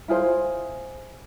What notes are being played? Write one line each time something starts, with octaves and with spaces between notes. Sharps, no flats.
E4 F4 G#4 C5